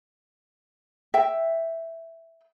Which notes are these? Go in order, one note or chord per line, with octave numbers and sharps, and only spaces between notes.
E5 G5